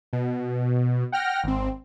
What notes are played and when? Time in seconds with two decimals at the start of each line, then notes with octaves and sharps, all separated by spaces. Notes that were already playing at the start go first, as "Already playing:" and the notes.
0.13 B2
1.12 F#5 G5 F6 A#6
1.43 G#1 C4